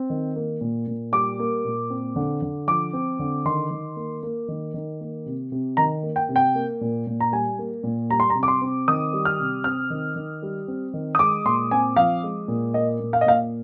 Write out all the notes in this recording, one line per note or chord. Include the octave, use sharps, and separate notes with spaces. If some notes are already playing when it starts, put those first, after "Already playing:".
Already playing: C4
D#3
A#3
A#2
A#2
G3 D6
A#3
A#2
C4
D3
D3
F3 D6
C4
D3
D#3 C6
D#3
A#3
A#3
D#3
D#3
A#3
C3
C3
D#3 A#5
A#3
G5
C3
G5
A#3
A#2
A#2
A#5
G3 G#5
A#3
A#2
G3 A#5
C6
A#5
C3
D6
C6
C4
D#3 D#6
G3
F6
C3
C4 F6
D#3
D#3
G3
C4
D#3
D#6
G#3 D6
A#2 C6
C4 G#5
F3 F5
G#3
A#2
A#3 D#5
A#2
F5
D#5
A#2 F5